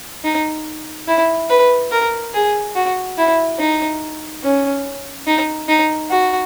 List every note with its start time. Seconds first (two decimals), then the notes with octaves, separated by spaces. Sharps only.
0.24 D#4
1.07 E4
1.49 B4
1.91 A#4
2.34 G#4
2.75 F#4
3.18 E4
3.59 D#4
4.43 C#4
5.27 D#4
5.68 D#4
6.11 F#4